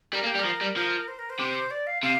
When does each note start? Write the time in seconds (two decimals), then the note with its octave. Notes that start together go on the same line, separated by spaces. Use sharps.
0.13 G3 A#4
0.23 A#3
0.27 G4
0.35 G3
0.39 A#4
0.45 F3
0.61 G3
0.76 F3 A#4
1.08 C5
1.19 A#4
1.30 C5
1.40 C3
1.71 D5
1.87 F5
2.03 C3 F5